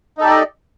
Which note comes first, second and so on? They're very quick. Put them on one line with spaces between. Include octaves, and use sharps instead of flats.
D#4 A4 G4 D5 D#5